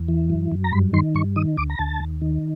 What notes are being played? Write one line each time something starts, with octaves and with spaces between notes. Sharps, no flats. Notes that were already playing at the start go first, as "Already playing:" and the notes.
Already playing: E2
E3
F#2
F#2
A#5
G2 B5
D#3 C6
G2 C#6
D#3 D#6
D2 D6
A#5
D2 A5
D#2
D#3